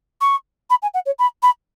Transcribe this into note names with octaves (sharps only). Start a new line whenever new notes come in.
C#6
B5
G#5
F#5
C#5
B5
B5